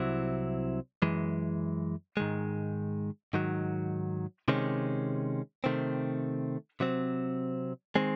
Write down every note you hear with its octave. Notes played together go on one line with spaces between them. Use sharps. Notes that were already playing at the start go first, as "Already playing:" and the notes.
Already playing: C2 C3 F#3 C4 E4
F#2 E3 G#3
G#2 D#3 G#3
G#2 D#3 F#3
C3 D#3 G#3 C#4
C3 D#3 A3 C4
C3 F#3 C4
D#3 G#3 C4